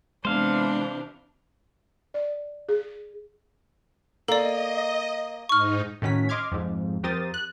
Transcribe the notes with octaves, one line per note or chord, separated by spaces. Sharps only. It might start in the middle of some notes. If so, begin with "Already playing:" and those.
C3 E3 G#3 B3 D4 C5 F5
D5
G#4
A#3 A4 D5 D#5
G#2 D#4 C#6 F6
A2 D#3 C#4 F#4 B6
D#5 C6 D6 F6 G#6
F2 G#2
F2 G4 A#4 C5 D#6 A6
F#6